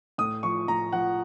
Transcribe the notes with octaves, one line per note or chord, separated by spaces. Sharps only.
A2 D#6
F3 C#6
A2 A#5
F3 F#5